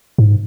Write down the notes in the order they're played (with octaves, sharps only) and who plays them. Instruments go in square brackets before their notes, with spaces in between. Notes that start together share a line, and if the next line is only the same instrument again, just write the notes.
[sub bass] G#2